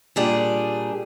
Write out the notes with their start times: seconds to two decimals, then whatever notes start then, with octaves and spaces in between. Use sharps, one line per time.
0.16 A#2 G3 D4 G#4